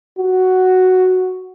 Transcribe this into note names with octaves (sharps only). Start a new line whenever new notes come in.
F#4